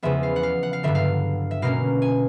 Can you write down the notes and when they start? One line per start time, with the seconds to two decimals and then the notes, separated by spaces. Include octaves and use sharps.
0.03 E2 C#3 F3 G#3 B3 E5
0.23 F5
0.36 F#5
0.43 F5
0.63 F#5
0.73 F5
0.83 G2 D3 F#3 E5
0.95 F5
1.51 E5
1.62 B2 F#3 A#3 C#4 F5
2.02 G#5